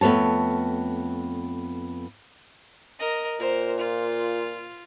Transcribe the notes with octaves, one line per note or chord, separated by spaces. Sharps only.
F2 A3 B3 C#5 A5
A#4 D#5
A#2 A#4 C5
F4